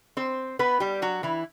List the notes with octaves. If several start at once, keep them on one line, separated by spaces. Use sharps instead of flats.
C4 C5
B3 B4
G3 G4
F#3 F#4
E3 E4